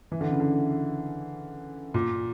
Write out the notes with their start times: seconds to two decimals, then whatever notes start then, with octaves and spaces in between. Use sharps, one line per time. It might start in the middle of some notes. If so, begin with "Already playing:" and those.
0.12 E3
0.21 D3
0.31 C#3
0.40 D3
1.94 A#2